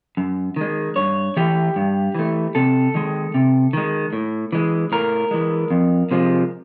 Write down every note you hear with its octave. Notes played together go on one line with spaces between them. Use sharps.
F#2
D#3 G#3
G2 C#5
E3 A3 G4
G2
E3 A3
C3 A4
D#3 G#3
C3
D#3 G#3
A2
E3 G#3
A2 A#4
E3 G#3
F2
C3 F3 G#3